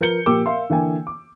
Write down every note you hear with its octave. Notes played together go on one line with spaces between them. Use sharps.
F3 A#4 B4 G6 C#7 G7
A#2 F3 A#3 G4 D6 E6
A#4 E5 F5 C6
D3 E3 A#3 G5 G#5
D6